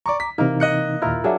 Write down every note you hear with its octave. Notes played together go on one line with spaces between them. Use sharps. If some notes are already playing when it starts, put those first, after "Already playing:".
D5 A#5 C#6 D6
B6
C3 E3 A#3 D#4 A#4
D#5 F#6 C#7
D#2 A#2 E4 F4 A#4 F6
F#3 A#3 D4 G#4 E5